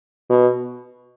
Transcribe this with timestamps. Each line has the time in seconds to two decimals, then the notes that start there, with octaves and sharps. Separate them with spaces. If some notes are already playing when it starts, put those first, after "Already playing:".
0.30 B2